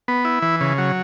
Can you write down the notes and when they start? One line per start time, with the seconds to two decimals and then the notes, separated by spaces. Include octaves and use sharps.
0.08 B3
0.25 E4
0.42 E3
0.61 C#3
0.78 F#3